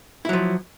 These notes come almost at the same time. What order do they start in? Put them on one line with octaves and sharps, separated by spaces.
E4 F#3 F3